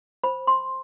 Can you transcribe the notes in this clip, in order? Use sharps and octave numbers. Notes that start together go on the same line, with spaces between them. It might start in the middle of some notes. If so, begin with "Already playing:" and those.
C5 B5
C6